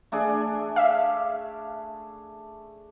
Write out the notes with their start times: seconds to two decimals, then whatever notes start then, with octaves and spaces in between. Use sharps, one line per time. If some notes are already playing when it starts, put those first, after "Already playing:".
0.12 A3 D4 G#4
0.76 E5 F5